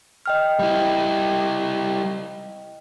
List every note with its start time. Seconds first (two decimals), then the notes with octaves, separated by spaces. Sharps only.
0.26 D#5 G5 F6
0.59 G3 E4